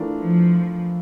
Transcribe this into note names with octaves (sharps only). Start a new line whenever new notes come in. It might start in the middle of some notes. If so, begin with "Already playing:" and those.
Already playing: E3 A3 D4 F4 A#4
F3